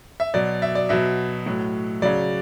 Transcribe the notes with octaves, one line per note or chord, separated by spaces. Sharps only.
E5
B2 F#3 D5
E5
D5
B2 F#3 E5
A2 F#3
C#3 F#3 D5